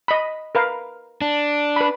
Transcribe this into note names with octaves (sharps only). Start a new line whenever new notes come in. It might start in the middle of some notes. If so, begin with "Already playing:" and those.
D#5 B5
A#4 B4 F5
D4
B4 B5